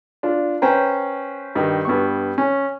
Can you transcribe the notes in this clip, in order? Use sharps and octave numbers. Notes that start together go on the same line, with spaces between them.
D4 F4
C#4 B4 C5 G5 A#5
G2 D#3
G2 B3 C#6
C#4